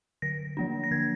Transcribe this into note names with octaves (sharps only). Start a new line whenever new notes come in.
D3 A#6
F3 A#3 D4
A#6
D3 G#6